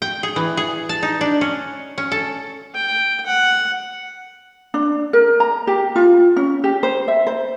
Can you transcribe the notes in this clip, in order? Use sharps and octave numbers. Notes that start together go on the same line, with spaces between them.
G5
G#4
E3
G#4
A5
D#4
D4
C#4
C#4
A4
G5
F#5
D4
A#4
A#5
G4
F4
C#4
G4
C5
E5
C5